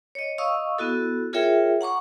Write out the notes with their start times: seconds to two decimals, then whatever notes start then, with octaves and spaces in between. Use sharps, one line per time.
0.15 C#5 D#5
0.38 D#5 F5 C#6 D#6 E6
0.79 B3 E4 F#4 A4
1.33 F4 G#4 A#4 C#5 E5 G5
1.81 F#5 A#5 C#6 D6